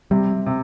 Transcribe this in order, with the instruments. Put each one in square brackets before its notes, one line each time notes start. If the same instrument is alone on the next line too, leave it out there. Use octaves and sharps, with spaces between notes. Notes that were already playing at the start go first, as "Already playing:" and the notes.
[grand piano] C3 [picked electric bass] G3
[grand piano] C3